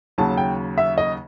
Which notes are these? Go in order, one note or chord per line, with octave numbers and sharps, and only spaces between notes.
D#2 C#3 F#3 A5
G5
E5
D#5